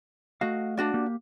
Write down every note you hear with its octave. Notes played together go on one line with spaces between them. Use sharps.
A3 F#4 D#5 F5
D4 F#4 D5
A#3 G4